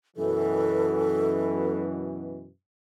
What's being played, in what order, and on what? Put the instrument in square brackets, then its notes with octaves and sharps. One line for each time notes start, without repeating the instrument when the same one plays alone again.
[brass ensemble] F#2 B2 E3 [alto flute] A4